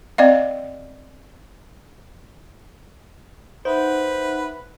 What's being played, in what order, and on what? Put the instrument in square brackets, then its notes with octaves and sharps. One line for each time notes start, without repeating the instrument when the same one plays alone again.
[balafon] C4 D5 D#5 F5
[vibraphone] D#4 E5 F#5 [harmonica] B4 [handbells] C5